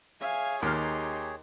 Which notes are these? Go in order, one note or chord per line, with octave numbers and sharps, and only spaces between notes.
G#4 C#5 E5 F5 G#5
D#2 D#4 G4 C6 F6